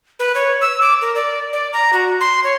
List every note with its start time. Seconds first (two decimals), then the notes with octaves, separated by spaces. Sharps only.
0.19 B4
0.35 C#5
0.61 E6
0.81 D6
1.02 A#4
1.15 D5
1.53 D5
1.73 A#5
1.93 F#4
2.21 C6
2.44 C#5